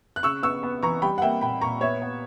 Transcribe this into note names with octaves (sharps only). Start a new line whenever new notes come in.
F#6
C#3 C#6 E6
B3 C#6 E6
B3
E3 A#5 C#6
G3 G5 B5
F#5
A#3 E5 G5
A#2 G5 B5
A#2 A#5 C#6
B3 C#5 E5
B3